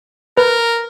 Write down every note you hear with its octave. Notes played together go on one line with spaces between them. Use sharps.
A#4 B4